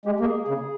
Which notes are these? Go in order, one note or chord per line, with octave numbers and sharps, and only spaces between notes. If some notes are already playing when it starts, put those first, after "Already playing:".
G#3 G4
A#3
G#4
C#3 G#4